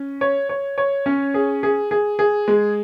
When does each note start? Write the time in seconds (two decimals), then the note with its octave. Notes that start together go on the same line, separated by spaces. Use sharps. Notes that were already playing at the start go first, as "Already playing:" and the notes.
Already playing: C#4
0.21 C#5
0.49 C#5
0.78 C#5
1.06 C#4
1.34 G#4
1.63 G#4
1.91 G#4
2.19 G#4
2.48 G#3